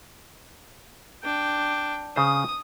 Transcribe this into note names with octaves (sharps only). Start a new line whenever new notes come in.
D4 G5
C#3 C5 D#6